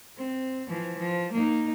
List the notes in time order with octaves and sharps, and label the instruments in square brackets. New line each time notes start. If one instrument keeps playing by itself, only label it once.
[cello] C4
E3 F3
F3
A#3 D#4